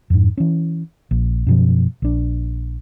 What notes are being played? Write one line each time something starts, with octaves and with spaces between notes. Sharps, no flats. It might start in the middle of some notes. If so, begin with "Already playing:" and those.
F2 G#2
E3 C#4
A#1
F#2 B2 F3
A#1 D4